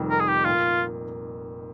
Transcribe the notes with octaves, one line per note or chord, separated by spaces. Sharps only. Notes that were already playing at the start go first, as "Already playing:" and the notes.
Already playing: F1 F2 D#3 G3
A#4
G#4
G4
A#2 F3 A#3 F4